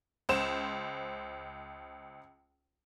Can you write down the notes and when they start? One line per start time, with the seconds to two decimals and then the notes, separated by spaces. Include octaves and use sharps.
0.29 C#2 C5 E7